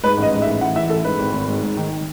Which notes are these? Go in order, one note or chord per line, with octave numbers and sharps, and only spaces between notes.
G#2 B4
A1 D#5
G#2
E5
A1
E3 F#5
E3 E5
A1 A4
G#2 B4
G#1
G#1
G#2
G#2
D#3
D#3